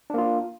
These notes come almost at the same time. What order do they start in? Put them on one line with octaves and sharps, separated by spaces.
D4 A#3 F4